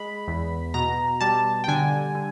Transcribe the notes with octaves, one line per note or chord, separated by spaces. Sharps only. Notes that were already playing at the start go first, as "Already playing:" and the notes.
Already playing: G#3 B5
E2
B2 A#5
G3 A5
G5
D3 G#5
D3